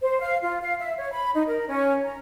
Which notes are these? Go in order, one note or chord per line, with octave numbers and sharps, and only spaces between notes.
C5
F5
F4
F5
E5
C#5
B5
D#4
A#4
C#4
A#5